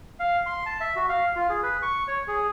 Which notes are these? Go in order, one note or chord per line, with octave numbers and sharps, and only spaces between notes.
F5
C6
A5
E5
F#4
F5
F4
G#4
B4
C#6
C#5
G#4